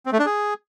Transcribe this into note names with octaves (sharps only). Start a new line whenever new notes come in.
C4
A3
D4
G#4